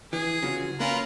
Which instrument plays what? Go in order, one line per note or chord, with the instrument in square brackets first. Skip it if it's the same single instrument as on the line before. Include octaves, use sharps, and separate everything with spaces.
[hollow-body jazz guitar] E3 [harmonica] G#4
[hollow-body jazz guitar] C#3 F#3 F4
[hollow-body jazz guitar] A#3 C#4 [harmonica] F4 A#4 B4